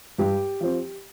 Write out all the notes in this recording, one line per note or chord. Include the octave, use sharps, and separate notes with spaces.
G2 G4
F3 C4